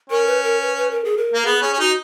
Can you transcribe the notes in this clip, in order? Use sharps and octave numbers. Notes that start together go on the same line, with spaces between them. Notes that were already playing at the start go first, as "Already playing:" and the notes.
C#4 A#4
B4
A#4
B4
B4
A#4
G#4
A#4
A#3
B3 G#4
C#4 G#4
C#4
D#4 F#4